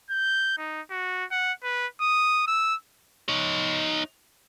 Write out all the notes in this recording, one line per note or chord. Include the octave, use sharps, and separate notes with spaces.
G6
D#4
F#4
F#5
B4
D#6
E6
D#4 C#5